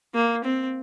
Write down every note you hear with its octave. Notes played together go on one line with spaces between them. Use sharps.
A#3
C4